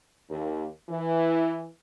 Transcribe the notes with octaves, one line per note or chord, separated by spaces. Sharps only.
D#2
E3